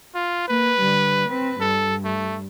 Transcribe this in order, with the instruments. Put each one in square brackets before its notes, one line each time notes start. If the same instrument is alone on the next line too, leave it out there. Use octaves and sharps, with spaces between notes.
[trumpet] F4
[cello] A#3 [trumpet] B4
[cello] D3 G3
C4 B4
[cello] G2 [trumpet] A4
[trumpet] A3